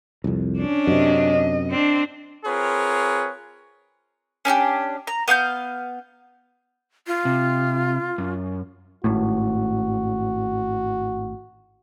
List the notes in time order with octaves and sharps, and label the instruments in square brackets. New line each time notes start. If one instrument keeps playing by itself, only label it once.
[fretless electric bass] C2 F2
[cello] C#4 D4
[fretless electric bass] F#2 C3 [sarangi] D#5
[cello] C4 D4
[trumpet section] C4 F4 G#4 A#4 B4 C#5
[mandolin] C#4 D4 F#4 G4
A#5
B3 F5 C6 G6
[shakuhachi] F4
[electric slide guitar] C3
F#2
[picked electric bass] G#1 A2 [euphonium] F#4